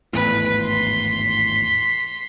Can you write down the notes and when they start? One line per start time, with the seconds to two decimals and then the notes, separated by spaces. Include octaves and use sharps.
0.13 G#1 E2 A2 B4
0.62 C6 B6